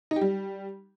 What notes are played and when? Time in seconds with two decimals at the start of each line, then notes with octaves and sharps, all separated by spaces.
0.11 D#4
0.16 G4
0.21 G3